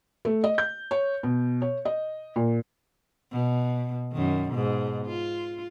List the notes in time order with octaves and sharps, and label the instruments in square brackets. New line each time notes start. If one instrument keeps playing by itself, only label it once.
[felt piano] A3
D#5
G6
C#5
B2
C#5
D#5
A#2
[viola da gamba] B2
F#2 D#3
G#2 B2
F4